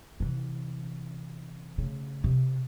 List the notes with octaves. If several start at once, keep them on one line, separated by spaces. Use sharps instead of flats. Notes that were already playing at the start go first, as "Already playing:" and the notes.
C3 E3
C#3 A3
C3